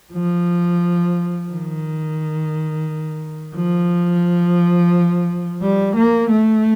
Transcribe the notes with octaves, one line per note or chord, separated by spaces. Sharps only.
F3
D#3
F3
G3
A#3
A3